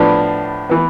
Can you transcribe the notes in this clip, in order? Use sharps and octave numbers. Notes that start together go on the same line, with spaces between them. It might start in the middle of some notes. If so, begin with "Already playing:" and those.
Already playing: A2 F3 B3 D4
E3 B3